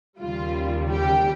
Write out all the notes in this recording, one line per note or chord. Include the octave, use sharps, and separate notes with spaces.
D#2 C#3 G3 F4
G4